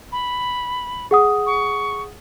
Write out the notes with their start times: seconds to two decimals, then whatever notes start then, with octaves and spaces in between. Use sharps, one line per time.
0.12 B5
1.11 G#4 F#5 D#6
1.46 C#6